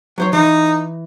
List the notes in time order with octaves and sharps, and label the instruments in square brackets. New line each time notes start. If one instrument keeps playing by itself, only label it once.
[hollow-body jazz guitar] F#3 C5 C#5
[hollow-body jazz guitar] E3 [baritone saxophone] D#4